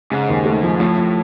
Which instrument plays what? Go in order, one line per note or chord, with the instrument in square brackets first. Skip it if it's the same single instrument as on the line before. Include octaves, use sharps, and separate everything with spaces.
[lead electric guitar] G#2 [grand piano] C#3
[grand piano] D#2
A3
F3
[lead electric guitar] A2 [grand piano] F3
[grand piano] F3